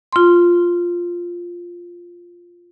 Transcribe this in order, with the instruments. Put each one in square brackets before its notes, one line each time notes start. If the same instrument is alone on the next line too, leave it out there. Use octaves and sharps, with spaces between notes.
[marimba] F4 C6